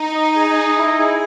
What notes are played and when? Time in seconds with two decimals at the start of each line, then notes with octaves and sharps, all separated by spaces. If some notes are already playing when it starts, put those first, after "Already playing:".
Already playing: D#4
0.14 D#5
0.36 G#4
0.56 D#5
0.77 E4
0.99 G#4